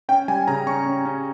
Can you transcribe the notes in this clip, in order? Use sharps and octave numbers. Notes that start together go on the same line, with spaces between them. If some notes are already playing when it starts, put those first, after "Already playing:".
C#4 G5
G3 G#5
C#3 A#5
C#4 C#6
C#4
C#4